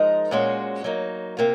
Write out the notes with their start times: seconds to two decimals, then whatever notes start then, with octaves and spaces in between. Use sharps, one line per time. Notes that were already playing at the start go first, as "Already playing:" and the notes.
Already playing: F3 G#3 D#4 A#4
0.31 A#2 G#3 C#4 F#4 C5
0.84 F#3 A#3 D#4
1.37 C3 A#3 F4